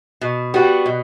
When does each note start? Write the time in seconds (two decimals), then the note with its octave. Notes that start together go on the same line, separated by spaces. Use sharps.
0.21 B2
0.54 G3 B3 F#4
0.86 B2